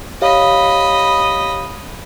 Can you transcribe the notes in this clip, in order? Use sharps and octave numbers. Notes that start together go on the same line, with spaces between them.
G4 C#5 D#5 F5 B5